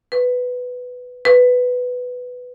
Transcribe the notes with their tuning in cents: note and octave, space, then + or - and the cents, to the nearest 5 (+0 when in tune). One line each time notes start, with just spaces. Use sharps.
B4 +5
B4 +5